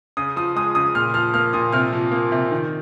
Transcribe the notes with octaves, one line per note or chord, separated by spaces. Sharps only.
C#3 D#6
F3 D#6
G#3 D#6
C#3 D#6
A#2 F6
F3 F6
A#3 F6
A#2 D#6
C3 F6
F3
A#3
C3
D#3